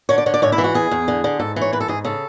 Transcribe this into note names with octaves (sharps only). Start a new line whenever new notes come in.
D3 C#5
D5
D3 C#5
D5
G#2 C#5
E4
E3
F#4
E2 G#4
E2
D3
D3
G#2 A4
E3
C#5
G#2 B4
A4
G#2 G#4
C#3 A4